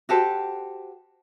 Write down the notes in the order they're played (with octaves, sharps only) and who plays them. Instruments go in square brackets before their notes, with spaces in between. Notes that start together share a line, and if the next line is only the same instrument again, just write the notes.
[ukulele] F#4 G4 A4 C5